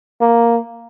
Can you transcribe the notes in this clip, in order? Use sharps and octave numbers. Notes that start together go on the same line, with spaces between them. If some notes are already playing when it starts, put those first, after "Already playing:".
A#3